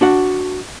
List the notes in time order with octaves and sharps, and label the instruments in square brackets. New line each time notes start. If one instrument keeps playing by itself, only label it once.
[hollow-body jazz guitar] D4 F#4 F#5